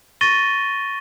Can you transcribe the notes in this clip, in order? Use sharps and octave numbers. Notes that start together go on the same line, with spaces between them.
C#6 A6 A#6 D#7 G7